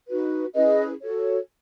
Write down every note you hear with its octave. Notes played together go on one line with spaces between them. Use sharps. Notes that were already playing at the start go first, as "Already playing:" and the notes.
D#4 F#4 B4
C#4 E4 G#4 B4 D#5
F#4 A4 C#5